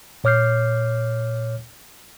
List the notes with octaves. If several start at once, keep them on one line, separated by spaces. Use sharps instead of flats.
A#2 C#5 D6 F6 G6 C7